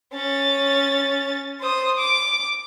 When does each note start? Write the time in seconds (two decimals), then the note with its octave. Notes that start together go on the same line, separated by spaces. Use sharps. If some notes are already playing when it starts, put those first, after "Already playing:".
0.13 C#4 A6
1.61 C5 D#6
1.98 D6